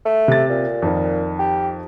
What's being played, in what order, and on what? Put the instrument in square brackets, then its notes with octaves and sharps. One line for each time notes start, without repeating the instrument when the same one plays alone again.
[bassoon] A3
[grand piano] C3 A6
[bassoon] A#2
[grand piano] F2 D#3
[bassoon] G4